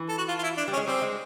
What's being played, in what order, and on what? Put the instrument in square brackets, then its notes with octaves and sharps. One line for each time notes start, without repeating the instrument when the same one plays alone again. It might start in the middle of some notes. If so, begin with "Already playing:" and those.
Already playing: [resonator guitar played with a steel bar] E3
[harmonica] A4
F#4
F4
F4
E4
D4
[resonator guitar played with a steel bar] G3
[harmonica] C#4
[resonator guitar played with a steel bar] G#3
[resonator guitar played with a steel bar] G3 [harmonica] C4
[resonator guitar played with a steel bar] G#3